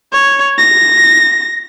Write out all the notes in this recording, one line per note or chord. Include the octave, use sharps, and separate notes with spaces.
C#5
A#6